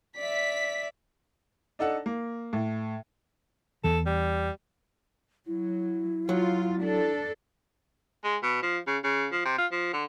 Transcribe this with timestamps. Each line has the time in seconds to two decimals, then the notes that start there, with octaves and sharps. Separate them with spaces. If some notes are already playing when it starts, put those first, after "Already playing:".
0.18 D5 E5 B6
1.79 D4 D#4 A4 F#5
2.06 A#3
2.53 A2
3.84 E2 E3 A4
4.06 G3
5.47 F#3 E4
6.29 F#3 F4
6.82 D4 A4
8.24 G#3
8.43 B2
8.63 F3
8.87 C#3
9.04 C#3
9.32 F3
9.45 C3
9.58 F4
9.72 F3
9.93 D3